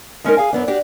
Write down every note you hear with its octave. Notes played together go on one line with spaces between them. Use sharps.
G#3 C#4 D#4 A#4
G#4 F5 G#5
F#2 B2 B3 D4
D4 F#4 G4